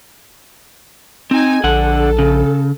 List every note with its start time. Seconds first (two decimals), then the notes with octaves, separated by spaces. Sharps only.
1.31 C4 D#4 G#5
1.64 A#1 D3 A4 F#5
2.19 C#3